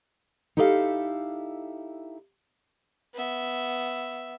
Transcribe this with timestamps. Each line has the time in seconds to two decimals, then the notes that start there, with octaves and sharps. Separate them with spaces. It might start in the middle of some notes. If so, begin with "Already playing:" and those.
0.57 D#4 E4 G4 A4 B4 F5
3.14 B3 E5